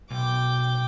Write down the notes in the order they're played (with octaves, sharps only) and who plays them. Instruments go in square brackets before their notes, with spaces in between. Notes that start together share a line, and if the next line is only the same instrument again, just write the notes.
[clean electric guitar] B1 [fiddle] G5 D6